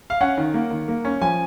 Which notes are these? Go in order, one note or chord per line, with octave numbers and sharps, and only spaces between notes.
F5
C#4 F#5
D#3
A#3
D#3
A#3
C#4
F3 G#5